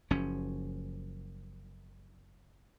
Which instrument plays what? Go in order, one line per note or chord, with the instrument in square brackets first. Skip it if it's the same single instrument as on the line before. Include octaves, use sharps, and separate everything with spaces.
[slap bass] F#1 F3 C#4